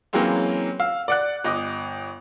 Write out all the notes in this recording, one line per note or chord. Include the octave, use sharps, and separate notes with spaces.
E3 F#3 G#3 A#3 C4 C#4
F5 E6
D5 F#5 F#6
G1 D#5 D6